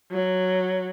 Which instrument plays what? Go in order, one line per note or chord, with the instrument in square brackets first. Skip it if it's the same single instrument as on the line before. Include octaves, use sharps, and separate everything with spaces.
[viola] F#3